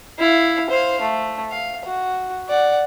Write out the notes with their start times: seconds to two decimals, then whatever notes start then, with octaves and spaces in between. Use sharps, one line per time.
0.19 E4 F5
0.70 C5 F5
1.01 A3
1.51 F5
1.85 F#4
2.48 D5 F#5